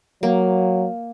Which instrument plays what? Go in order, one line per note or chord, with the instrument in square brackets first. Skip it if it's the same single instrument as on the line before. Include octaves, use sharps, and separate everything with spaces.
[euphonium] F#3 [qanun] A#3